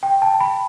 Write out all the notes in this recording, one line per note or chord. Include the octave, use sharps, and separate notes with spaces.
G5
A5
B5